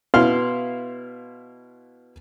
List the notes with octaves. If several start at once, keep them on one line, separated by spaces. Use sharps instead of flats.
B2 E4 F5 C6 F6